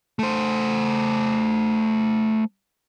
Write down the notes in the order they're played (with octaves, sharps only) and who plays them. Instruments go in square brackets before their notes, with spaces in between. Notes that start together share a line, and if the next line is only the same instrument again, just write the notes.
[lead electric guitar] A3 C5